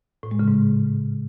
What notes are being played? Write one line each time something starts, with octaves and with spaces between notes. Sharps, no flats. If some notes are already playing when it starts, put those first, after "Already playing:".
A2
G#3
C#3
G#2